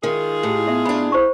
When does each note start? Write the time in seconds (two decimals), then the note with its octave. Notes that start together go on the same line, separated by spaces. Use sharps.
0.03 D#3 G#3 F4 G#4
0.43 A2 G4
0.67 B3 E5
0.85 A2 D4 B5
1.12 E4 C5 C#6